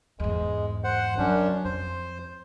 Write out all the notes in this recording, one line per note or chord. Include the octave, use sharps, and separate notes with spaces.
E2 G#2 G#3
C5 F#5
F#2 F#3 C#4 D4
F2 C5